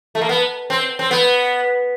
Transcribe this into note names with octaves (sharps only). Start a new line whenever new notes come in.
A3
A#3
B3
C4
C4
B3